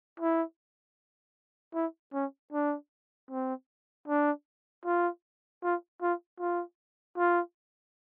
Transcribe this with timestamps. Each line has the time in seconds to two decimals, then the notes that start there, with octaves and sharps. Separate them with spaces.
0.20 E4
1.74 E4
2.13 C#4
2.52 D4
3.31 C4
4.08 D4
4.85 F4
5.63 F4
6.02 F4
6.40 F4
7.17 F4